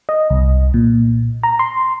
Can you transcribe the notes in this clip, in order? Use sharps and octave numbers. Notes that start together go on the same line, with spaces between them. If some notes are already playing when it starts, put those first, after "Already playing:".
D#5
C2
A#2
A#5
C6